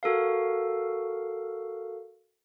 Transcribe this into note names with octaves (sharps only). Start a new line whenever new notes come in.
F#4 A4 A#4 F5